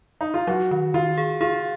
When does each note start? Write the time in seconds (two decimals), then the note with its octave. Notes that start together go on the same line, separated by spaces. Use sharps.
0.21 D#4
0.34 F4
0.47 F#3 F#4
0.71 D#3
0.94 D#3 F4
1.18 G#4
1.41 F4 G#4